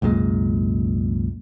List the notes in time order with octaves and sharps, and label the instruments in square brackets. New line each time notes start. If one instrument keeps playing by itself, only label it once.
[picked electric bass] C2 F#2 A#2 G#3